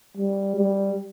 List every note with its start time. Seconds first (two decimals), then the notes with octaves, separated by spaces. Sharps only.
0.17 G3
0.56 G3